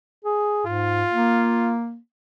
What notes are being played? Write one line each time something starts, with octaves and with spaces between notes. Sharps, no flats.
G#4
G#2 F4
A#3